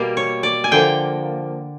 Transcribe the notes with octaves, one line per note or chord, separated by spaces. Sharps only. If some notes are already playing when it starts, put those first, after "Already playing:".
Already playing: B2 G3 A#3
C#5
D5
G#5
D3 F3 A#3 G5